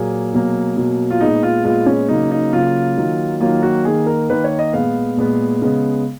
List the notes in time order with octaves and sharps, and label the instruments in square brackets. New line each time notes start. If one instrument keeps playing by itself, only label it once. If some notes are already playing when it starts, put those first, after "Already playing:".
Already playing: [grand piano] A#2 F#3 A#3 G#4
B2 F#3 A#3
B2 F#3 A#3
F4
A#2 G#3 B3 D#4
F4
A#2 G#3 B3 F4
C#4
C#3 F#3 A#3 D#4
D#4
C#3 F#3 A#3 F4
D#3 F#3 A#3
D#3 F#3 A#3 F4
F#4
D#3 A#3 G#4
A#4
D#3 A#3 B4
C#5
D#5
A#2 G#3 B3 F5
A#2 G#3 B3
C#3 G#3 B3